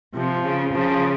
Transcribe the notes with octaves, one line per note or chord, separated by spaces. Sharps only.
C3 F3
C#3
C#3 F3